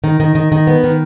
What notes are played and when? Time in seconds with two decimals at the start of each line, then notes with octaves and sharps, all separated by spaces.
0.04 D#3
0.20 D#3
0.35 D#3
0.52 D#3
0.67 B3
0.84 D#3